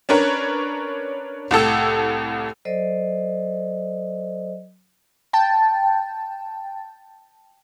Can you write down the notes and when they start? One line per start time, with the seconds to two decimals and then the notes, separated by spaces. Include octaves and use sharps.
0.09 C#4 D4 A#4 B4 C#5
1.51 C2 A2 A4 E6
2.65 F#3 A4 C5 D5 D#5
5.33 G5 A5